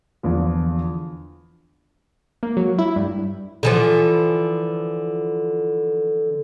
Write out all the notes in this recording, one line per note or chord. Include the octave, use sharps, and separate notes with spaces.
E2 D3 F3
A#3
F#3
E4
G2
D3 E3 F3